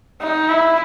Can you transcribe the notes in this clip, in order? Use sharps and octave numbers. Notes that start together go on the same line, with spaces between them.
D#4
E4